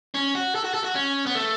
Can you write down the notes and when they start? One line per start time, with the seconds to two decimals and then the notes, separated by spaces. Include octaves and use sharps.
0.14 C#4
0.35 F#4
0.55 A4
0.64 F#4
0.74 A4
0.84 F#4
0.95 C#4
1.26 B3
1.35 A3